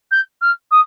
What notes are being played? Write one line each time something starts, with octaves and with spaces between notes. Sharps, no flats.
G6
F6
D#6